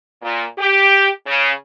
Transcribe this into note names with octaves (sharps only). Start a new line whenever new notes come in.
A#2
G4
C#3